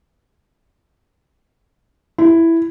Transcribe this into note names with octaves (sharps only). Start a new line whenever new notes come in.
E4